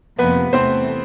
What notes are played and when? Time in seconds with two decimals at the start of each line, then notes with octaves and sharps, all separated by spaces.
0.18 F2 C3 F3 A#3 B3 B4
0.53 E2 C3 E3 A3 C4 C5